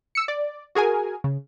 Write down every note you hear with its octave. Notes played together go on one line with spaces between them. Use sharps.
E6 C#7
D5
F#4 G#4 A#4 G#5
C#3